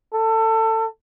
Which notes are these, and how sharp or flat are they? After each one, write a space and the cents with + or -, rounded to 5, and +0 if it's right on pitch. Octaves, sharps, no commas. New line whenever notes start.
A4 +25